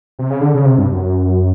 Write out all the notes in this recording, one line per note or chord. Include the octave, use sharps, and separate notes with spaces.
C3
C#3
D3
C#3
C3
G2
F#2